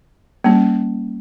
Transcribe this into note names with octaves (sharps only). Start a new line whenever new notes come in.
G3 A#3 C#4